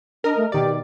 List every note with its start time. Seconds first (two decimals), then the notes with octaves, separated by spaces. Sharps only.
0.24 D4 A#4 D#5
0.37 A3
0.52 B2 D#3 G4 D5